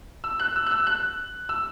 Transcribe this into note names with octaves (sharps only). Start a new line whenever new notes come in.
E6
F#6
E6
F#6
E6
F#6
E6